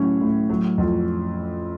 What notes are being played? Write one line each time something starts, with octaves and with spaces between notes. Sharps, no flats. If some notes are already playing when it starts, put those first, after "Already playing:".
Already playing: A2 F#3 C#4
A2
F#3
F2